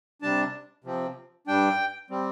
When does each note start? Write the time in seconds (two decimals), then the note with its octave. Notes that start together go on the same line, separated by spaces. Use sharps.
0.22 C3 G3 D4 A5
0.84 C3 F3 C4
1.47 G2 G3 D4 G5
2.10 G3 C4